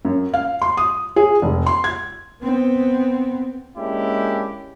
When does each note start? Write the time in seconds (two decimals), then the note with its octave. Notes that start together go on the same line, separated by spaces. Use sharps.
0.05 F#2
0.34 F5
0.62 C6
0.77 D#6
1.16 G#4
1.42 F1
1.66 C6
1.84 G#6
2.43 B3 C4
3.77 G#3 A#3 C#4 D4 E4 G4